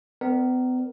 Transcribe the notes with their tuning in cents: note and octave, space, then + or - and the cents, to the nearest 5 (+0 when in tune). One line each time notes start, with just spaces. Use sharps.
B3 +40 A#4 +0 D5 +10